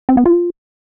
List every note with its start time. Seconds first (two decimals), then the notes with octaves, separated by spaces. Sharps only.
0.09 C4
0.17 B3
0.26 F4